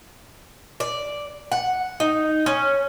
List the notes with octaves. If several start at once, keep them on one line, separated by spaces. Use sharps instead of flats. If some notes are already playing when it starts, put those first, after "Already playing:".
D5
F#5
D#4
C#4